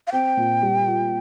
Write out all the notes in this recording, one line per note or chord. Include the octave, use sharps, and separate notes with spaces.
F5
C4 G5
A#2
G3
F4